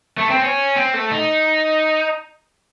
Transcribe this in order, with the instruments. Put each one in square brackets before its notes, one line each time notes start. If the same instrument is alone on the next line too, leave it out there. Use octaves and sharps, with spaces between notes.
[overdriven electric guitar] A3
C4
C#4
C4
A3
D#4